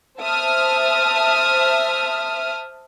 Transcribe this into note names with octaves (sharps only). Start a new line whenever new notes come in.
C5 E5 A5 D#6 F6